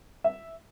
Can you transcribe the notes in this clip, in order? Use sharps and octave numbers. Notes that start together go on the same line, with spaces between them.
E5